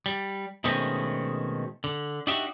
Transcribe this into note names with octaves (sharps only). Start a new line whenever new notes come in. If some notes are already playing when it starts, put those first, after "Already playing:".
G3
B2 D#3 G#3 A3 C4 C#4
D3
D4 D#4 F#4 G4 E5